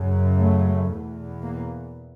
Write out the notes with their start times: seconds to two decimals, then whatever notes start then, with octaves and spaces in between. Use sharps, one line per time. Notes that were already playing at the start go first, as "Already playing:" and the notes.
Already playing: F#2 C#3
0.38 A3
0.90 E2 B2
1.42 A#3